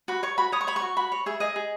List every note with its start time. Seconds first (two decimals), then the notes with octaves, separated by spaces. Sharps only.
0.08 F#4 B5
0.23 C#5 C#6
0.38 F#4 B5
0.52 C#5 D#6
0.61 C#6
0.67 C#5 B5
0.76 C#6
0.82 F#4
0.96 F#4 B5
1.12 C#5
1.26 G#4 E5
1.40 G#4 D#5
1.56 G#4